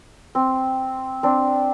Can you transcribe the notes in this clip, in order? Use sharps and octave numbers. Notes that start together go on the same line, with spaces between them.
C4
C4 D4